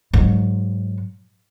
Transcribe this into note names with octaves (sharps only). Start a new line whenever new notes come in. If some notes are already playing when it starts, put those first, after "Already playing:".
G#2 F#3